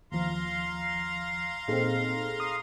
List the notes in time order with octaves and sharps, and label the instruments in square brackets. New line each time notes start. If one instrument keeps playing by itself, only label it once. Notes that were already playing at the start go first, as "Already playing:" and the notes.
[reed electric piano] D#2 F3 [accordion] F5 A#5 C6
[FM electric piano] A#2 G#4 A4 [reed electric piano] C4 D#4
[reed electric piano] D#6